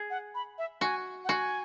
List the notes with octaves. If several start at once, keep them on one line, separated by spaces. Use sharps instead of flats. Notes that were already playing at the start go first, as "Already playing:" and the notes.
Already playing: G#4
F#5
B5
E5
F#4 G#5
F#5
F#4 G#5